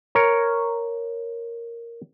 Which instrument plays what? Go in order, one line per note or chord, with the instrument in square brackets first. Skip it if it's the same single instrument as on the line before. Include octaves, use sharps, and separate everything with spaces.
[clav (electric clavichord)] A#4 C#5